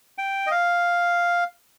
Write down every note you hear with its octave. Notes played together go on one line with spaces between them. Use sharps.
G5
D#5
F5